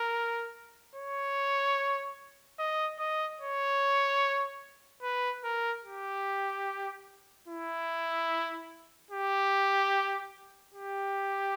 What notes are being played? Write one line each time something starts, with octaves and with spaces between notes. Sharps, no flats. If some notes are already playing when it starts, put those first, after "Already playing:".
Already playing: A#4
C#5
D#5
D#5
C#5
B4
A#4
G4
E4
G4
G4